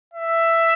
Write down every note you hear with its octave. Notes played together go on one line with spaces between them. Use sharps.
E5